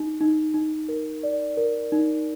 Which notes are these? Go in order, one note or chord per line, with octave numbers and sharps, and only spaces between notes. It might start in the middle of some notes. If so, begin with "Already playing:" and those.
Already playing: D#4
D#4
D#4
A#4
D5
A#4
D#4